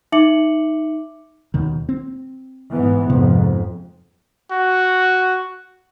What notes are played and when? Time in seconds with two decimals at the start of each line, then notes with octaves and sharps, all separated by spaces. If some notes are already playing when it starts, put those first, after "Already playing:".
0.12 D#4 E5 D6 C#7 F#7
1.54 D#2 B2 D#3
1.89 C4
2.71 G#2 E3 B3
3.10 F2 G#2 C3
4.52 F#4